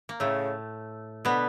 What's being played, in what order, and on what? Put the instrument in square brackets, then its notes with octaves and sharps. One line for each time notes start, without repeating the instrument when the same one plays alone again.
[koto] A#3
[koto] A2 A3 [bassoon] C#3
[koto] B2 B3 [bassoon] D3